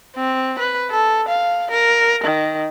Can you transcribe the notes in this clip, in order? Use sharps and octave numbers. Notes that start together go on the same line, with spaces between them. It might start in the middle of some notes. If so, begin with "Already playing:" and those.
C4
B4
A4
F5
A#4
D#3